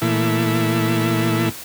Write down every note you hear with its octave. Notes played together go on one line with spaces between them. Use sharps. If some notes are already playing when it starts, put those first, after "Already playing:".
A#2 E3 A3 E4